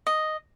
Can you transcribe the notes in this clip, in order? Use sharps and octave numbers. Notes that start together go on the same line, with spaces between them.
D#5